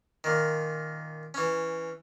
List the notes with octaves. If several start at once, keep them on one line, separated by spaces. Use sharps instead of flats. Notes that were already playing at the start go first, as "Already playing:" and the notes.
A#2 D#3
E3 C#4